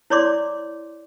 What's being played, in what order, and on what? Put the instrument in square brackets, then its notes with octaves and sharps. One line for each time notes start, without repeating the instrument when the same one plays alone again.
[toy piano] E4 C#5 D5 C6 D6